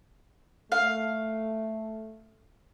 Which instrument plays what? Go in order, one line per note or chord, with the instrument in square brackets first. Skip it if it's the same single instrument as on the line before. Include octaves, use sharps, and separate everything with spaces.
[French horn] A3 [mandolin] F5